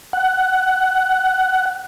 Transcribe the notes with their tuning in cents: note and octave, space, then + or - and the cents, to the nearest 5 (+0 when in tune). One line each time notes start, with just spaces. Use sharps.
F#5 +15